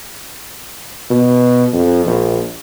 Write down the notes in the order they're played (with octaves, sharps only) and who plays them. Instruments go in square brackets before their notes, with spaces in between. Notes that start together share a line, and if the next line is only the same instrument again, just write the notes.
[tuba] B2
F2
A#1